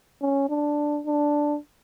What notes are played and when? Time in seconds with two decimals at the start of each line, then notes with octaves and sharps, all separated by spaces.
0.22 C#4
0.49 D4
1.06 D4